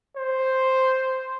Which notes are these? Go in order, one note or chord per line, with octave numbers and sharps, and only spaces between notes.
C5